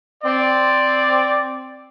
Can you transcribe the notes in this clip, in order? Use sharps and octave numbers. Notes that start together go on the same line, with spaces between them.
C4 D5